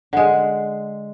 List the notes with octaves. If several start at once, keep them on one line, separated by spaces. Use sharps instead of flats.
D3 G#3